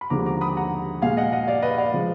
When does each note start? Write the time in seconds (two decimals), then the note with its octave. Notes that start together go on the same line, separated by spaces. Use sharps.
0.01 B5
0.10 D#2 D3 F3 G#3 A#5 D6
0.26 A#5 D6
0.41 B5 D#6
0.57 F#5 A#5
1.02 A#2 G#3 F5 G#5
1.17 D#5 F#5
1.32 D#5 F#5
1.48 D5 F5
1.62 B4 D#5
1.78 D5 F5
1.94 F3 G#3